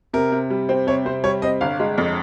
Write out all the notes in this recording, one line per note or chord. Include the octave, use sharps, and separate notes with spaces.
C3 A#4
C3
G3
C4
C3 C#5
C3 C5
G3 C#5
C4 D#5
G1 F5
G#3
F2